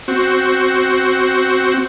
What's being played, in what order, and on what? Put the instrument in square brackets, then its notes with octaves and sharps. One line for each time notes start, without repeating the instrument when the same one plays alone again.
[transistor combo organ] C4 F#4